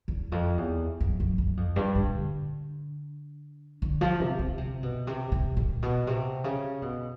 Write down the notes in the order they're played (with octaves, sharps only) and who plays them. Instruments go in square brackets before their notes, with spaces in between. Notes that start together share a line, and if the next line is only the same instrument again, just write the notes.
[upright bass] E2
F2
E2
F#2
F#2
F#2
F2
G2
G#2
D3
D3
F3
C3
C#3
C3
B2
C3
C3
A#2
B2
C3
C#3
B2